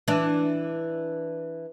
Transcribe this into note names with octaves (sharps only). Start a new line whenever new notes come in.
E3 D4